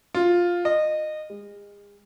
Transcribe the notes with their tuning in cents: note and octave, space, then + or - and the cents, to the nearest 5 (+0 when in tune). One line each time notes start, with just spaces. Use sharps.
F4 +5
D#5 -20
G#3 -40